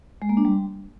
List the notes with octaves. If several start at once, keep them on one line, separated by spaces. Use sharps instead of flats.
G#3
A#3
D4
G3